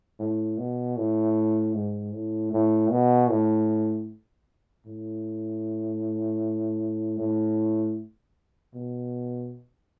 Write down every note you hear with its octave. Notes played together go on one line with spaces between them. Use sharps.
A2
B2
A2
G#2
A2
A2
B2
A2
A2
A2
B2